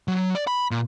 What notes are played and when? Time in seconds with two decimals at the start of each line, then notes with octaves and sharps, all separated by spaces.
0.08 F#3
0.35 D5
0.47 B5
0.71 A#2